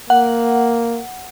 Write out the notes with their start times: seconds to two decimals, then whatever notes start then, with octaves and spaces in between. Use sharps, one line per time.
0.10 A#3 F#5